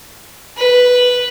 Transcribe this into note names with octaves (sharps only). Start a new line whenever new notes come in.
B4